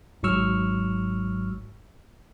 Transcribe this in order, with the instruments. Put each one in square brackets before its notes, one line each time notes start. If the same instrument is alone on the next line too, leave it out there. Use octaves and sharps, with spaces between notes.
[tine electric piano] G#1 G#2 F#3 C#6 E6 F6